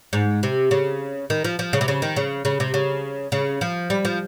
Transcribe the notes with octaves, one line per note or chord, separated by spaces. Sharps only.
G#2
C3
C#3
D#3
F3
F3
C#3
C3
C#3
D#3
C#3
C#3
C3
C#3
C#3
F3
G3
F3